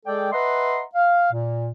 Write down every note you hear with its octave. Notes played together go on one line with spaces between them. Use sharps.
G#3 G#4 A4 D5 G5
B4 D#5 E5 F#5 A#5 C6
F5
A#2